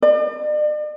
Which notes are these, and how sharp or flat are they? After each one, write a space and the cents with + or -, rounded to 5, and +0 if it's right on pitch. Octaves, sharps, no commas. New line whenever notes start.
D5 +45